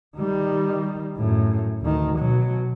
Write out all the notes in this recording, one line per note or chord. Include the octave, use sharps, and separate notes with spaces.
D#3 G3
F#2 A2
D2 D#3
B2 F#3